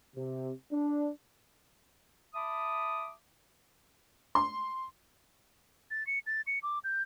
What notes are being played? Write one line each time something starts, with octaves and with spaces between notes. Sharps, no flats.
C3
D4
E5 A5 B5 D6 D#6
C6
A6
C#7
A6
C#7
D6
G6